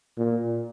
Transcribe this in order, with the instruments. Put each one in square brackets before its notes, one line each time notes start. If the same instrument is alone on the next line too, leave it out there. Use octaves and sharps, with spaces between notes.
[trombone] A#2